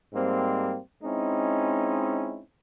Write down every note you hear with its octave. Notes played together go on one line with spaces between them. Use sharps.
G#2 G3 A#3 C4
G#3 C4 C#4 D#4 E4